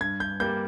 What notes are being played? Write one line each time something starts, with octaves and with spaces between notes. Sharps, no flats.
G2 G#6
G6
G3 A#3 G6